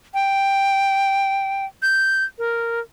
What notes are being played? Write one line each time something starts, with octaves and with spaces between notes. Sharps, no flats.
G5
G6
A#4